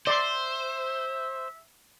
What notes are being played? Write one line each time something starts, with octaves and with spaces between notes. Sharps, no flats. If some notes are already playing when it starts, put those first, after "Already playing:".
C5 D5 E5 C6